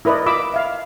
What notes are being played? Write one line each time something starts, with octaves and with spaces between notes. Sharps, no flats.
E4 A#4 B4 D5 D#5
F4 D#5 B5 D6 E6
E5 F5